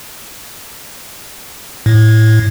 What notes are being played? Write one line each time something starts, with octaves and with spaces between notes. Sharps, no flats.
A2